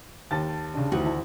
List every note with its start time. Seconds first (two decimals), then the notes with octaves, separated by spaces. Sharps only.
0.31 D#2 A5 A6
0.74 C#3 D4
0.92 D2 D#3 E3 F#4
1.06 E4 A5